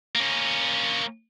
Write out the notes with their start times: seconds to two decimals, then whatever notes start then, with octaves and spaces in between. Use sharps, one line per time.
0.16 A#3 C#4